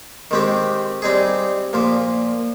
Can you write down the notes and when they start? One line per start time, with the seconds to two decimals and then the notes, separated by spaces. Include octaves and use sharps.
0.31 D#3 G#3 C4 G4
1.02 G3 C4 D#4 G#4
1.73 A#2 F3 A#3